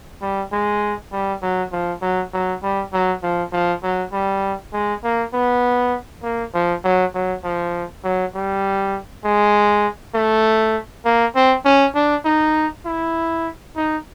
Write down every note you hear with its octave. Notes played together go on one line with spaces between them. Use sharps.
G3
G#3
G3
F#3
F3
F#3
F#3
G3
F#3
F3
F3
F#3
G3
G#3
A#3
B3
A#3
F3
F#3
F#3
F3
F#3
G3
G#3
A3
A#3
C4
C#4
D4
D#4
E4
D#4